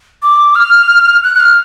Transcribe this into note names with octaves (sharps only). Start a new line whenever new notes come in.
D6
F6
F#6
F#6
F6